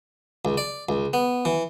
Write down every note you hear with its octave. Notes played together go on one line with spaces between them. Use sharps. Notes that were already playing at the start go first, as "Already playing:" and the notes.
C#2
D5
C#2
B3
E3